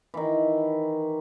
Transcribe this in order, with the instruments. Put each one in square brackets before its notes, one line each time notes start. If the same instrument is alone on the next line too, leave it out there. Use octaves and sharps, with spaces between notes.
[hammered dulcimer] D#3 E3